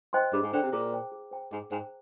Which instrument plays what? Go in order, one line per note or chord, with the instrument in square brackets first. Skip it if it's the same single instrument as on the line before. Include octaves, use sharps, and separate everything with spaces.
[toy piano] C5 D#5 G5 C6
[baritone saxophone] G2 [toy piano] G#4
[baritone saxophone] G#2
[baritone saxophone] D3 [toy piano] C5 G5 A#5
[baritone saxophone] C3
[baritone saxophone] A#2 [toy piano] G#4
[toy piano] C5 G5 A#5
G#4
C5 G5 A#5
[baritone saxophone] G#2 [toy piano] G#4
[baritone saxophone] G#2 [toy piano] C5 G5 A#5